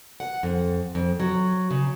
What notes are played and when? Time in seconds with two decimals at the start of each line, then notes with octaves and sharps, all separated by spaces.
0.20 F#5
0.43 F2
0.95 F2
1.20 F#3
1.71 C#3